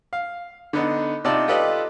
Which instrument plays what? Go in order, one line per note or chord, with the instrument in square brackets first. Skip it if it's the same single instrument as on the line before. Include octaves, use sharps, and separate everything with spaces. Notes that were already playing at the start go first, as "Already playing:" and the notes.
[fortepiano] F5
D3 B3 D#4
C3 D#4 F4 D5 A5
F4 G4 A4 B4 D5 D#5